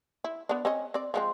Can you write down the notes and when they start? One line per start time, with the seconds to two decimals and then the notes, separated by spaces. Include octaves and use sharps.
0.24 E4
0.49 B3 D4
0.65 C4 C#4 D#5
0.94 C4 D5
1.14 F3 G#3 C4